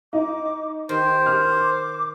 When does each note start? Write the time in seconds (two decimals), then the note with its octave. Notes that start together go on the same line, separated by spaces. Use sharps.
0.13 D#4 D6
0.89 D#3 G4 C5
1.26 F6
1.52 D6